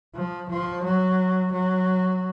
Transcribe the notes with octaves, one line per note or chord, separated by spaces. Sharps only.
F3
F3
F#3
F#3